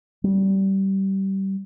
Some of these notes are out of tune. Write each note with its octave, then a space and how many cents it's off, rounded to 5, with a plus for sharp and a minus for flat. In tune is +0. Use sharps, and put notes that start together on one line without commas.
G3 -20